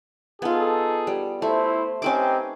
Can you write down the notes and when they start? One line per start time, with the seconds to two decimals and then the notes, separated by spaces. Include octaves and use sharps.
0.42 B3 D#4 F4 G#4 A4
1.07 G3
1.42 A3 E4 C5
2.02 C4 C#4 D#4 G4 B4 D6